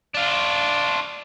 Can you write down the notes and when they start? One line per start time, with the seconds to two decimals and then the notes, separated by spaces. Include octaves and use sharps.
0.15 D4 F4